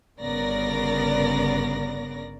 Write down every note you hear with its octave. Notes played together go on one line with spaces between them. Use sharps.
G1 C#3 B3 A#4 D5 A#6